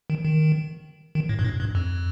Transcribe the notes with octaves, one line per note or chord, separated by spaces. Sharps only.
D#3
D#3
D#3
A2
G2
A2
G2
F2